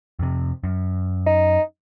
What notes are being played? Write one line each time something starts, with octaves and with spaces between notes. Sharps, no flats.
F2 C3
F#2
D#4